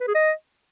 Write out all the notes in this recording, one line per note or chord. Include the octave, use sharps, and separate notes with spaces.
B4
G#4
D#5